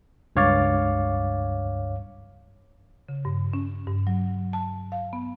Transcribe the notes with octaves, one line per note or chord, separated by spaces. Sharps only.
C#2 G2 C#5 F5 D6 A6
C#3
G2
C#4
G2
F#3
A5
F5
B3